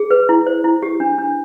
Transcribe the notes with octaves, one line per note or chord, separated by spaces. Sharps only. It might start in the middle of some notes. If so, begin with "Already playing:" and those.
Already playing: G#4
B4
E4
C5
E4
G4
D4
D4